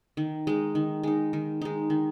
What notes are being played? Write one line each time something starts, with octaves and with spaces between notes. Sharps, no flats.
D#3
G#3 D#4
D#3
G#3 D#4
D#3
G#3 D#4
D#3